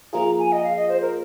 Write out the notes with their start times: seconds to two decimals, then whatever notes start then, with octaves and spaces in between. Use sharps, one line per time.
0.13 F3 A#3 F4 G#4 A#5
0.39 G#5
0.52 D#5
0.64 F5
0.76 D#5
0.89 C5
1.02 A#4